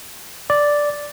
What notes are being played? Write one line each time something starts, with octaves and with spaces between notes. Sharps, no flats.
D5